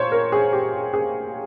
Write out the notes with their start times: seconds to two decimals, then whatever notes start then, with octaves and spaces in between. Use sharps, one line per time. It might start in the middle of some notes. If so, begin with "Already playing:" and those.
Already playing: A#2 C5 C#5
0.12 A#4
0.32 G#4
0.53 G4
0.94 G#4